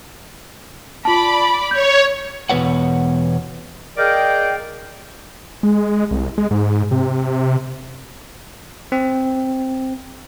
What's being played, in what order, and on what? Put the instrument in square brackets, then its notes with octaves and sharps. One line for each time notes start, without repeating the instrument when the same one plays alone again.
[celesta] F4 A5 [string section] D5 B5
[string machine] C#5 [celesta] G6
[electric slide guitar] E2 B2 G#3 B4 C#5 F#5
[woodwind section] G#4 A#4 D5 D#5 F5 G5
[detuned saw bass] G#3
C2
G#3
G#2
C3
[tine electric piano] C4